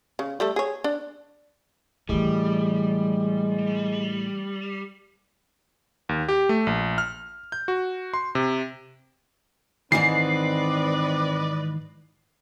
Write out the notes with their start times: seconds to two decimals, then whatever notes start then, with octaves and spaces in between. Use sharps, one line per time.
0.19 C#3
0.40 G3 A3 A4
0.56 G#4 C#5
0.84 D4
2.09 A2 D3 E3 G3 G#3
6.09 D#2
6.29 G4
6.49 A3
6.67 A#1
6.98 F6
7.52 G6
7.68 F#4
8.14 C6
8.35 C3
9.92 G#2 D#3 E3 C4 B4 D5 D#5 C7